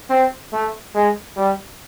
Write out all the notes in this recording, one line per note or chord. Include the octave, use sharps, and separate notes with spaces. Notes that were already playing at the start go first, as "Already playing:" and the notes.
C4
A3
G#3
G3